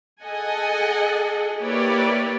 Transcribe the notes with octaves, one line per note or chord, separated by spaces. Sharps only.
G#4 A4 D#5 F#5 G#5
A#3 E4 G4 B4 C#5 D5